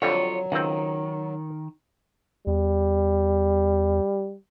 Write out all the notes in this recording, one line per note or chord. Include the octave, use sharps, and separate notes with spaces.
F2 D3 F#3 G3 F4 C#5
C#2 D#3 C4
E2 G3